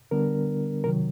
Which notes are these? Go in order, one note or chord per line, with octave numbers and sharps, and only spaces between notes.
D3 G3 B3 D4 A#4
C3 D#3 F#3 A#4